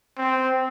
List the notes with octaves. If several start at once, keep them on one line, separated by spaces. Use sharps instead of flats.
C4